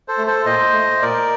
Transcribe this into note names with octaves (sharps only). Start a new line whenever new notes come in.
A4 C5
A3
A4 C5
A#2 C5 D#5
A3
A#2 A#4 D5